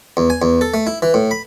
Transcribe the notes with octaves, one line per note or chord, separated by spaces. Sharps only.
E2
G#5
E2
A4
A3
E4
E3
A2
B5